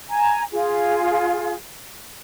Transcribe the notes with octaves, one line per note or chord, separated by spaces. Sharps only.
G#5 A#5
F4 G#4